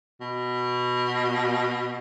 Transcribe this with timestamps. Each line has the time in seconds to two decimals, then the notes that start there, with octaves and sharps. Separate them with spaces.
0.21 B2